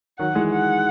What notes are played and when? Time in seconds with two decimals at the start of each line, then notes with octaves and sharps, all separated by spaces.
0.19 D#3 F#3 F#5
0.35 E3 G#3
0.52 F#5